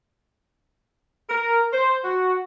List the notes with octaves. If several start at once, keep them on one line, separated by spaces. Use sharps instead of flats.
A#4
C5
F#4